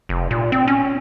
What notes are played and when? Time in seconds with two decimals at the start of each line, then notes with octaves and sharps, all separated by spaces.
0.09 F1
0.31 A#2
0.52 C4
0.68 C#4